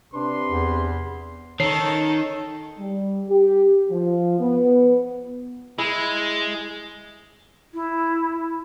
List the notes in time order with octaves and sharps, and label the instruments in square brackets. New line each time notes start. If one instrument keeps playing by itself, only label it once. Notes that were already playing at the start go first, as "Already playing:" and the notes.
[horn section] C3 B4 C6 [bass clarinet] D4
[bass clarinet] E2
[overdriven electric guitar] D#3 [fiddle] A4 [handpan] C#5 [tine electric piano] C7
[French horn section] G3
G4
F3
B3
[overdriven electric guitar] G#3 [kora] E4
[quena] E4